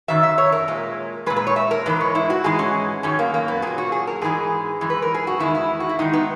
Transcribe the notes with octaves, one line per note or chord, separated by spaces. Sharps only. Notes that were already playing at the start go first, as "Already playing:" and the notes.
F#2 D#3 F#3 E5
E5
C#5
A#4
A#2 G#3
A#2 G#3 B4
B4
C#5
E5
A#4
G#2 E3 G#3 B4
C#5
E4
F#4
G#2 E3 G#3 G#4
C#4
F#2 D#3 F#3 C#4
A#3
A#3
B3
A#2 F#3 G#4
F#4
G#4
A#4
G#2 E3 G#3 G#4
F#2 E3 G#3
B4
A#4
G#4
F#4
E2 D#3 G#3 E4
E4
F#4
E4
G#2 D#3 G#3 D#4
B3